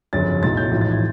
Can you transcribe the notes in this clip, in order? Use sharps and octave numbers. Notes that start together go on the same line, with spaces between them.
G1 F2 C#3 F#3 A6
B1 A2 F#3 A6
G6
A1 G#2 F3
A6
G#6